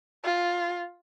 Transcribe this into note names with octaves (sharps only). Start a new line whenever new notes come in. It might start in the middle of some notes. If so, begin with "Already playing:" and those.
F4